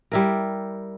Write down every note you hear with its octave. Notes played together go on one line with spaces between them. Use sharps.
G3 E4 A#4